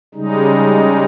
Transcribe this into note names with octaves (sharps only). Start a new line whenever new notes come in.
C#3 G3 G#3 D#4